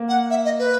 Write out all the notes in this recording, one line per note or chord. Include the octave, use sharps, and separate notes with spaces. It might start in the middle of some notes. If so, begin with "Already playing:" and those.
Already playing: A#3
F#5
E5
D#5
B4